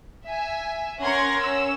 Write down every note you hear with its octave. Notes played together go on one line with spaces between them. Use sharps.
E5 G#5
C#4 A#4 F#5 C6 G#6 A#6
C#4 E6